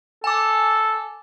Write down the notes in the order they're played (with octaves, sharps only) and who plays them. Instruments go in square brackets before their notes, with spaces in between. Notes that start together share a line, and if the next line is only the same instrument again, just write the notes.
[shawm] A4 [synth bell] G#5 D6